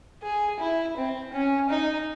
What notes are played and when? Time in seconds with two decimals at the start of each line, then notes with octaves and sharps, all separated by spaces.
0.23 G#4
0.60 E4
0.97 C4
1.33 C#4
1.70 D#4